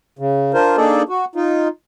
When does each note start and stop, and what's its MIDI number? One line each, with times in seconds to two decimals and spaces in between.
0.19 0.52 49
0.54 0.76 62
0.54 0.76 65
0.54 0.76 70
0.54 0.76 72
0.77 1.02 58
0.77 1.02 62
0.77 1.02 63
0.77 1.02 68
0.77 1.02 69
0.77 1.02 74
1.09 1.25 66
1.35 1.68 63
1.35 1.68 65